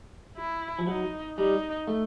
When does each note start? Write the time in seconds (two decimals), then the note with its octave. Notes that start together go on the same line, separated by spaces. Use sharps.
0.37 E4
0.79 F3
0.87 F#3 D#4
1.38 G3 D#4
1.87 A3